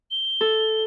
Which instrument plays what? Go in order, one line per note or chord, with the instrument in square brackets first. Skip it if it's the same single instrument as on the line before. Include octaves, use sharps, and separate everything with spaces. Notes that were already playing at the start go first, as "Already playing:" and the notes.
[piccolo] G7
[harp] A4